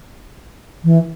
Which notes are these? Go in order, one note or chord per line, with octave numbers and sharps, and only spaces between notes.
E3